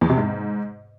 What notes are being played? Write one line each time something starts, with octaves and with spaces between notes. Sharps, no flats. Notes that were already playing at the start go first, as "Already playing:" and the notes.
E2
C3
G#2